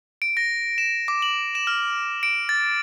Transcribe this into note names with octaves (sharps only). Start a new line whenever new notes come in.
D7
A#6
E7
D6
F#7
E7
F6
D7
A6